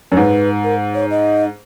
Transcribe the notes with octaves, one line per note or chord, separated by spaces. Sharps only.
F#2 A#4
G#2 B4
A#4
C#5
D#5